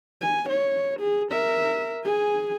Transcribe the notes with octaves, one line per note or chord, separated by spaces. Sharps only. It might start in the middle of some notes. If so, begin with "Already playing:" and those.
G#5
C#5
G#4
A#4 E5
G#4 G#5